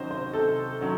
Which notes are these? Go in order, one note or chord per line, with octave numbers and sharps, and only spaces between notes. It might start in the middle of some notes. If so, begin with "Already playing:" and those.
Already playing: C3 D#3 F#3 C#4 C5 D#5
C5
C3 A4
D#3 F#3 C#4